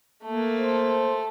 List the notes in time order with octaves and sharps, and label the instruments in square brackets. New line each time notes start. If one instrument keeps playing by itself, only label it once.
[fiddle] A3 [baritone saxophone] A#3
[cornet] C5